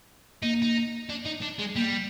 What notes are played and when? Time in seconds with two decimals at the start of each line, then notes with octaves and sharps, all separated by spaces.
0.42 A#3 D#4
0.62 D#4
1.10 D4
1.26 D#4
1.42 D4
1.59 G#3
1.76 G3 A#3